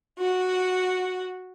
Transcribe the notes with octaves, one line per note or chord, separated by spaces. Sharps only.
F#4